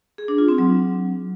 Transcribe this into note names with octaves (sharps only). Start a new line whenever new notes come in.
G#4
D4
F4
C4
F#3